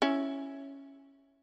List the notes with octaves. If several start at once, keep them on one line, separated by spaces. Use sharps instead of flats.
C#4 E4